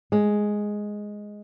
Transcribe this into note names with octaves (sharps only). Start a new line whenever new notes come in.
G#3